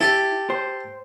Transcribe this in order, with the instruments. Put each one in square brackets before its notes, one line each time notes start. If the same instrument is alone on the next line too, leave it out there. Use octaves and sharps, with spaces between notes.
[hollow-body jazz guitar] E4 [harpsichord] G4 A4
[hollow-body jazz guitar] C5